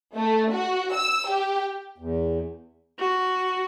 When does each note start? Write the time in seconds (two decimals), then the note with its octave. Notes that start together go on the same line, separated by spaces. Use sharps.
0.15 A3
0.51 F#4
0.93 E6
1.28 G4
1.98 E2
2.99 F#4